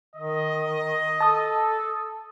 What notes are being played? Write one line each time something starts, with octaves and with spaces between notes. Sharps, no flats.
D#3 D#5
A4 A5 D#6